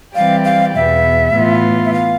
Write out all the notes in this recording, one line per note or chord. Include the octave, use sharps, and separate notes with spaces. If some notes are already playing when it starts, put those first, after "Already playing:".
E3 G3 C4 G4 D5 F5
F5
E2 B2 B3 E5
A2 E3 B3 F4
E5
F5